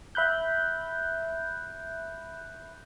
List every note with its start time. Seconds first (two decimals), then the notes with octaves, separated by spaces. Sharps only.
0.15 E5 B5 F#6 G6